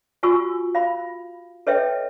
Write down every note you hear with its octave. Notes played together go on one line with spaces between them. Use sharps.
F4 F#4 G#5 C#6 E6
F5 B5
A4 B4 C#5 D#5 E5 G5